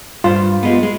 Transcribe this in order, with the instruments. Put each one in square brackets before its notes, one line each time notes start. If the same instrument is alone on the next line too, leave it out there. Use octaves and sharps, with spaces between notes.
[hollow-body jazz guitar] G2 C5 [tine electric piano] F4
[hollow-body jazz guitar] G3 G#3 B3
G#3